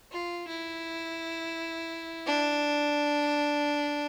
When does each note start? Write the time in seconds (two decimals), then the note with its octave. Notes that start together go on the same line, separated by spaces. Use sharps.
0.12 F4
0.48 E4
2.26 D4